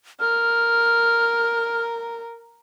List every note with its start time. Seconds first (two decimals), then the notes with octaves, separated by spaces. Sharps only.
0.20 A#4 F6